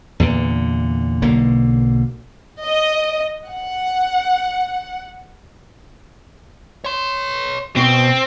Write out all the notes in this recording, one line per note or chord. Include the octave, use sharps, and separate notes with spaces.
E2 A#2 D3
B1 D3 A#3
D#5
F#5
C#5 C6
B2 C4